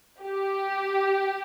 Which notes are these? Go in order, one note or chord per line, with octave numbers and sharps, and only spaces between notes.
G4